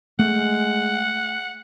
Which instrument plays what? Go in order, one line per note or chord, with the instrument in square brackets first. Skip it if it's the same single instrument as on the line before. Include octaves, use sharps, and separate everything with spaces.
[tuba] G#3 [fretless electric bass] A3 [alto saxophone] F#5